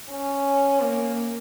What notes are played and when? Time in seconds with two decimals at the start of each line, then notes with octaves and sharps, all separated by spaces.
0.10 C#4
0.81 A#3